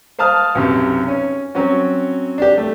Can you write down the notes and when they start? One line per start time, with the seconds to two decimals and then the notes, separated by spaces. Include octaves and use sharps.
0.19 C5 F5 A5 D#6 F6
0.55 B1 F#2 C3
1.08 C#4
1.55 F#3 C4 C#4 F#4
2.38 D4 G4
2.58 A3